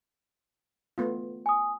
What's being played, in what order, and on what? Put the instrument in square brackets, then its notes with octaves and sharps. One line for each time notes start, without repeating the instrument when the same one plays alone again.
[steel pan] A3 B3 F4
[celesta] G#5 D#6